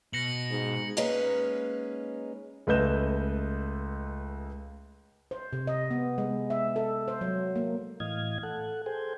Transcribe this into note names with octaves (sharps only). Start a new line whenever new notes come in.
B2 A#6 C#7 F#7
G#2
G#3 A#3 C#4 D#4 B4
C#2 A3 B4 D#5 G6 E7
C5
C3
D#5
B3
G#3
E5
A4
C5
F#3
A#3
A2 E3 D#5 F5 G#6
A4 F#5
G#4 A4 C5 G5 G#5